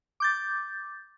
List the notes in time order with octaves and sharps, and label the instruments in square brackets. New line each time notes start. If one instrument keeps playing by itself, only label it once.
[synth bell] D6 G6 A6